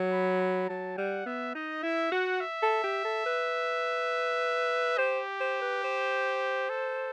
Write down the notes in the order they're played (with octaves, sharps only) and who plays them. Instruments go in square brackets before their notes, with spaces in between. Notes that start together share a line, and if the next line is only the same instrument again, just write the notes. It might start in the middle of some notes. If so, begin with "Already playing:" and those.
Already playing: [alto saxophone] F#3
[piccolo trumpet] B5
B5
[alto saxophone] F#3 [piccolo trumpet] A5
[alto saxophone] G3 [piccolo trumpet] F#5
[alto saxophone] B3 [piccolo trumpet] E5
[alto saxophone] D#4 [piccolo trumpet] D#5
[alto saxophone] E4 [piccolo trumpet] E5
[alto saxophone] F#4 [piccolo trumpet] F#5
[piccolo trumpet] E5
[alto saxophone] A4
G4
A4
B4
[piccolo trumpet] G4 [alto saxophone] C5
[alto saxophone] C5
B4
C5
[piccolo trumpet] A4